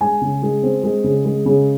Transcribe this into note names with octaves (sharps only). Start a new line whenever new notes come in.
G#3 G#5
C#3
G#3
C4
G#3
C#3
G#3
C#3